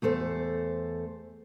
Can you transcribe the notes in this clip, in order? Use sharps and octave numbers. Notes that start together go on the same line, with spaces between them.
E2 A3 A4 C5